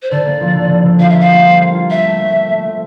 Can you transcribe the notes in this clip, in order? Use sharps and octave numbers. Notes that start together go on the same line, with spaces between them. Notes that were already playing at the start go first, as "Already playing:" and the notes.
C5
D3 D5
A#3
F3
D3
D3
D3
F4 F5
E5
A#3
F5
G3
C5
A#3
F4
C4 E5
A3
A3
A3
A3
A3